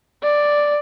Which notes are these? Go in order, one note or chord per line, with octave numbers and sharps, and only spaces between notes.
D5